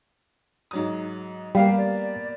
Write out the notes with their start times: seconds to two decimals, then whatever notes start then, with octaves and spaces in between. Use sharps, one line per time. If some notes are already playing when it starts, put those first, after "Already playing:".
0.71 G#2 F#3 D#6
1.55 G3 A#3 B3 G4 F5
1.78 D5